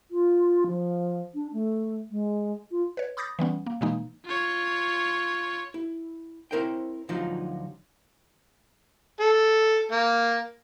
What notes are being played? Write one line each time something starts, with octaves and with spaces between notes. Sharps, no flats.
F4
F3
D4
A3
G#3
F4
B4 C#5
B5 D6 D#6 G6 A6 A#6
E3 G3 B3 C#4
A#3
B2 E3 G#3 A#3 D#4
F4 C#5
E4
C4 E4 A#4 C5 C#5 G5
D2 F3 F#3 D#4 F4
A4
A#3